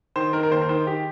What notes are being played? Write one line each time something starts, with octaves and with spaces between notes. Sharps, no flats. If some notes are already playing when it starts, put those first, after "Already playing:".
D#3 C5
D#3 A#4
A#4
D#2 C5
A#4
D#3 C5
D#3 G4